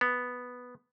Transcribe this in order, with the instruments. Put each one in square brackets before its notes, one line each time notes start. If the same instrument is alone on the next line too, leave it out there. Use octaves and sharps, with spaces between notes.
[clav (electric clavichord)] B3